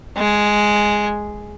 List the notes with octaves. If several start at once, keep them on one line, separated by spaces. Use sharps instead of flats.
G#3